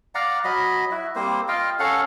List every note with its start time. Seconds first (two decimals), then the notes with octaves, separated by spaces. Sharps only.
0.15 D5 F5 F#5 A#5
0.44 F#3 D#5 B5
0.91 E4 F#4
1.16 G3 A#3 C4 C5
1.48 F4 D#5 F5 G5
1.79 C#4 A4 F5 F#5